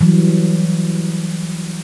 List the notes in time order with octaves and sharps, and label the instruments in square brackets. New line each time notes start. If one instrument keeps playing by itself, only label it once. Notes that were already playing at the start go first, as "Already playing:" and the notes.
[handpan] E3 F#3 G3